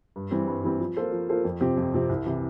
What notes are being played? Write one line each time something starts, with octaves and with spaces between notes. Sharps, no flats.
G2
E3 G3 C4
G2
E3 G3 C4
F3
A#3 F4 A4 C5
F3
A#3 F4 A4 C5
F2
C3 F3 C4 G4
F2
C3 F3 C4 G4
C2
C3 E3